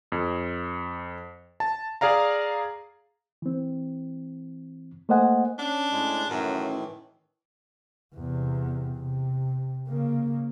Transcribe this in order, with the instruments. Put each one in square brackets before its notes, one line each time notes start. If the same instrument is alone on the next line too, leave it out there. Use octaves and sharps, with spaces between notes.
[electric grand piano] F2
A5
G#4 D5 F5 A#5
[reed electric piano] E3 C4
A3 A#3 C5 D#5 F#5 G#5
[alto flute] C#4 [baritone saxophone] D4
[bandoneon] A2 G#3
[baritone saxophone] F#2 [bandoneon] A2 D#3 E3 [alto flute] C#4
[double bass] E2 C3
C3
C#3 A#3